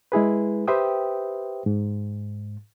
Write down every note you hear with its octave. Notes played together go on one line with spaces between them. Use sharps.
G#3 E4 G#4 B4
G4 B4 C5 E5 G5 D#6
G#2